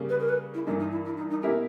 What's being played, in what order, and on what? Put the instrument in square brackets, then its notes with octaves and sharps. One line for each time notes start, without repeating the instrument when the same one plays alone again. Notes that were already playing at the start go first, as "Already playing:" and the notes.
Already playing: [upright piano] C#3 G3 A#3
[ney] B4
A#4
B4
E4
[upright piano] G2 E3 A#3 [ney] D#4
[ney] D#4
E4
E4
D#4
D#4
[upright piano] B2 A#3 E4 G4 A#4 [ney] C#4